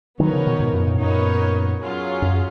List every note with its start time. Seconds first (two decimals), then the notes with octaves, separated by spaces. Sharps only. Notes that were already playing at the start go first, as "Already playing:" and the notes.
0.19 D#3 F#3 B3 D#4 A#4 C#5
0.32 C#3 F3
0.46 B2 D#3
0.60 G#2 B2
0.73 F#2 A#2
0.87 F#2 A#2
1.00 F#2 A#2 B3 D#4 A#4 C#5
1.80 F#3 C#4 F4 G#4
2.22 F#2